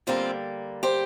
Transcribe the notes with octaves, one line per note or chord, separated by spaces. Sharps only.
D3 G3 A#3 C4 F4
G4 C5